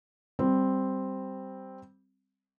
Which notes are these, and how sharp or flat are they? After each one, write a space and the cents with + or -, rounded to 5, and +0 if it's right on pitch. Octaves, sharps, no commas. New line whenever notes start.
G3 +0 C4 +0